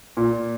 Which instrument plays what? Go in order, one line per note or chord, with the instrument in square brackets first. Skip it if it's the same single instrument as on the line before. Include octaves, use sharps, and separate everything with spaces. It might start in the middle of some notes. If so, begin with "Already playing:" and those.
[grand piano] A#2